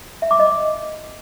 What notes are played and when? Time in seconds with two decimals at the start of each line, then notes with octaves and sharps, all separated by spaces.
0.22 E5
0.31 D6
0.39 D#5